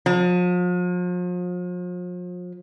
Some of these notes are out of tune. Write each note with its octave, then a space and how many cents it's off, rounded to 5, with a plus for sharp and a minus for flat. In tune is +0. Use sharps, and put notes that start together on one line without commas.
F3 +40